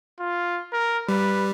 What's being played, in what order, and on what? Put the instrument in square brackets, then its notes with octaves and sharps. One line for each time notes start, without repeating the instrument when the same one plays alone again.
[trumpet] F4
A#4
[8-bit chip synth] G3 [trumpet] B4